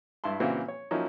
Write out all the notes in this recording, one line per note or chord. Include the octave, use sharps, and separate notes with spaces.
G2 E4 A5 C6
A#2 C#3 E3 C4 E4 F#4
C#5
F3 F#3 A#3 C#4 D#4 E4